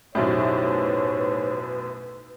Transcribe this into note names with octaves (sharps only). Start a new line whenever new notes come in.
B1 F#2 A2 D#4 G4 C5 C#5 E5
B4